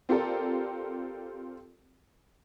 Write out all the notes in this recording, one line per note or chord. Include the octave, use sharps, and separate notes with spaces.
C4 F4 G4 A4 A#4 D5